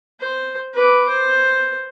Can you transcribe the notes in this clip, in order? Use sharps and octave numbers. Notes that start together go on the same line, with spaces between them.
C5
B4 D6
C5